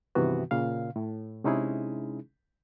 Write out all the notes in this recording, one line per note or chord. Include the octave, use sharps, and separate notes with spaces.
G2 C3 D#3 E3 B3 F#4
A#2 C#3 F5
A2
C3 G#3 C#4 D#4 E4 G#4